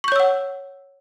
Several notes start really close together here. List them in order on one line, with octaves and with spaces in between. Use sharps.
C#6 G6 C#5 E6 F#5